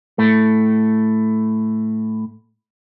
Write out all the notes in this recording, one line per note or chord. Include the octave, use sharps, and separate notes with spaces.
A2 A3